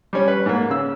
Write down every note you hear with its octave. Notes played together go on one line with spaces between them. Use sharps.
G3 C#4
B4
G#2 A#3
C#3 E6